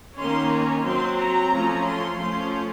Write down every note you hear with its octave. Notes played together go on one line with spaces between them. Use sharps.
D#3 A#3 C#4 C6
A#5
F#3 C4 C6
A#5
F3 A3 C#4
C6
F3 A3 C#4 C6